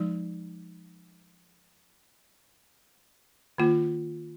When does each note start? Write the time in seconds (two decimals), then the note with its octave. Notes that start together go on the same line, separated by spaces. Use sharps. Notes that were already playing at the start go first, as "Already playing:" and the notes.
Already playing: F3 G#3 D#4
3.58 D#3 A#3 F4